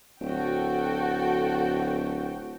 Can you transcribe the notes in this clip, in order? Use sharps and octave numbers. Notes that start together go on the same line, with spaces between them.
D1 F#4 A4 G5